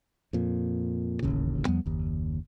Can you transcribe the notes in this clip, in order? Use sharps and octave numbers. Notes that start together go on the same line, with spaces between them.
F2 A#2
D1 A1 D#2 C#3
E2 F3 G3 B3
F#1 D#2